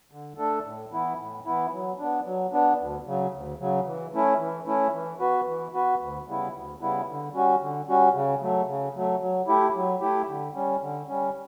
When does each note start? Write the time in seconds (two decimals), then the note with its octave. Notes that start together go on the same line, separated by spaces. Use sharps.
0.12 D3
0.38 A3 D4 A4
0.64 A2
0.92 E3 B3 E4
1.19 A2
1.45 E3 B3 E4
1.71 F#3
1.99 B3 D4
2.25 F#3
2.52 B3 D4
2.78 D2
3.06 C#3 F#3
3.33 D2
3.59 C#3 F#3
3.85 E3
4.13 A3 C#4 E4
4.39 E3
4.66 A3 C#4 E4
4.93 E3
5.20 B3 F#4 B4
5.46 E3
5.73 B3 F#4 B4
6.00 D2
6.27 C#3 G3 B3 E4
6.53 D2
6.80 C#3 G3 B3 E4
7.07 D3
7.33 G3 C#4 F#4
7.60 D3
7.88 G3 C#4 F#4
8.14 C#3
8.40 F#3 A3
8.67 C#3
8.95 F#3 A3
9.21 F#3
9.48 A3 E4 G4
9.74 F#3
10.01 A3 E4 G4
10.28 D3
10.55 G3 C#4
10.81 D3
11.08 G3 C#4